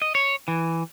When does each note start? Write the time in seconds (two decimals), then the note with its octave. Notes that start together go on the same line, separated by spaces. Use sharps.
0.02 D#5
0.15 C#5
0.48 E3